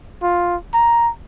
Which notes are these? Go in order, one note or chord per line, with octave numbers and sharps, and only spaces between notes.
F4
A#5